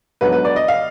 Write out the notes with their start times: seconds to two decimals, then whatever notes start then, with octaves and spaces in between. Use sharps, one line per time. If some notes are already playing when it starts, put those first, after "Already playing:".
0.21 G#2 F#3 B3 D4 B4
0.32 B4
0.45 D5
0.56 D#5
0.68 F5